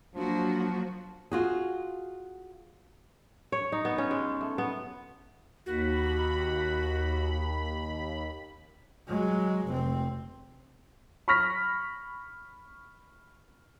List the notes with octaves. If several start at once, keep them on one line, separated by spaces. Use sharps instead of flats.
F3 F#3 A#3 D4 F#4
F4 F#4 G#4
C#5
D#4
B3
C#4
G#3
A3
B3
D#2 F#4 B5
F#3 G#3
F1 C4
B5 C#6 F6 A#6 B6